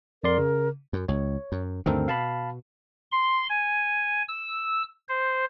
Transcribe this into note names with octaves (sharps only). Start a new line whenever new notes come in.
F2 A#4 D5 C6
C#3
F#2
C#2 C#5
F#2
D2 G2 D#3 C4 A4 A#4
B2 F5 A5 B5
C6
G#5
E6
C5